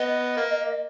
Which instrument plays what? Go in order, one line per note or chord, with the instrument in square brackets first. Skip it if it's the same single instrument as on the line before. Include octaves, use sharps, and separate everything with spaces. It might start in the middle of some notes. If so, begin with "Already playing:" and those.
Already playing: [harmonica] B3 [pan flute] D#5
[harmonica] A#3